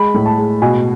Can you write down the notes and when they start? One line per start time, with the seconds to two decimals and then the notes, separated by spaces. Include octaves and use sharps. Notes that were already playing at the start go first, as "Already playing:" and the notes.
Already playing: G#3 B5
0.15 A2
0.26 A5
0.38 G#3
0.62 B2 G#5